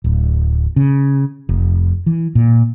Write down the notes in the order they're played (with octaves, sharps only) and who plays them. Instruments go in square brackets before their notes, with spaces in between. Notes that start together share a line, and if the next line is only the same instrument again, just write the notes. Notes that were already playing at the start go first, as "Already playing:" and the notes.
[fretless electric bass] D1
C#3
F1
E3
A#2